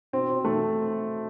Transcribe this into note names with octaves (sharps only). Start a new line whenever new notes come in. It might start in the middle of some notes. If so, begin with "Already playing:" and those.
B2 C4
B2
B2 A3